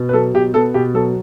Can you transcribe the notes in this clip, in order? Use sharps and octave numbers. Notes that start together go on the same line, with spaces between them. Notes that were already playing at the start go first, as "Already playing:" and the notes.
Already playing: B2
B4
F#3 A4
B2 G4
B3 A4
B2 G4
F#3 A4